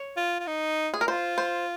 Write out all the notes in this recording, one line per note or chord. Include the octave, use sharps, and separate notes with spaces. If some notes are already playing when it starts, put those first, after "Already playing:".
Already playing: C#5
F4
F4
D#4
G#4
A#4
F4 C5
C5